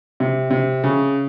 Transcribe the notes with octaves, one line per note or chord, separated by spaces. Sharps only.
C3
C3
C#3